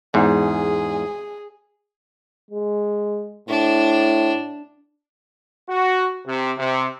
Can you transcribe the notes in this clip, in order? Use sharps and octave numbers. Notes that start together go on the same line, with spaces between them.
E2 G#2 G#4
G#3
A2 D4
F#4
C3
C3